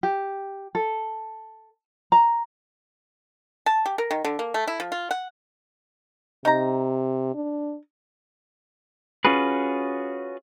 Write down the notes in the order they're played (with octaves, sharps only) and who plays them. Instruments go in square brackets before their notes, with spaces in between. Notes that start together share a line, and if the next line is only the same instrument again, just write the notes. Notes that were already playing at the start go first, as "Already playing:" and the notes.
[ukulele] G4
A4
A#5
[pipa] A5
G4
A#4
D#3
D3
A#3
A3
E4
F3
F4
F#5
[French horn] C3 [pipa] D#4 A#5
[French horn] D4
[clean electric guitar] C#4 F4 F#4 G#4 B4